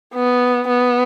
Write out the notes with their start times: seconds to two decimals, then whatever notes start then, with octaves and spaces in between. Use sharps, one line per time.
0.14 B3
0.68 B3